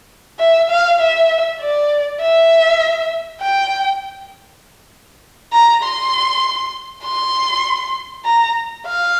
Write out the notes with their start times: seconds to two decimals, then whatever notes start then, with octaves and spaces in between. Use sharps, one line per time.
0.39 E5
0.70 F5
1.00 E5
1.61 D5
2.21 E5
3.41 G5
5.53 A#5
5.83 C6
7.04 C6
8.25 A#5
8.86 F5